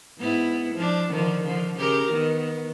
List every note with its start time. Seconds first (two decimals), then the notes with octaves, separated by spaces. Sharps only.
0.18 G#2 B3 E4
0.75 F3 D4
1.09 D3 D#3 F3
1.43 D3 F3
1.76 C#3 G4 A#4
2.10 D#3 B3